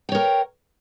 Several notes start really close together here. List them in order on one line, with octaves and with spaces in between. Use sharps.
G5 C#5 A#4